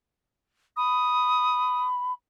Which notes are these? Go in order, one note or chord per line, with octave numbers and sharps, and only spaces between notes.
B5 D#6